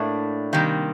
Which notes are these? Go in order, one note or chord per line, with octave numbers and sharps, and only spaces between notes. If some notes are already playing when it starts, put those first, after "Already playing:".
Already playing: A2 A3 A#3 D4
C3 D#3 G3 A#3